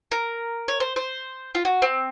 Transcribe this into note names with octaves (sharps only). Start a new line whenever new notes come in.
A#4
C#5
C5
C5
F4
F#4
C4